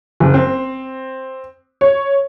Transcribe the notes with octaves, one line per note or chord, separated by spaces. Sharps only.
F#1
C4
C#5